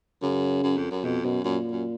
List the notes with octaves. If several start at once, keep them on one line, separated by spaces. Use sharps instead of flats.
F#2 C#3
F#2
F2
F#2
F2 B2
F#2 B2
F#2 A#2
F#2